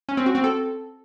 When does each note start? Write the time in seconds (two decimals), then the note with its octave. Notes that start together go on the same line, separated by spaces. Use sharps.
0.09 C#4
0.17 C4
0.26 F#4
0.35 C4
0.44 A4